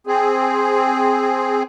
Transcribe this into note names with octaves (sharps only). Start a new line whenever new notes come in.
C4 G#4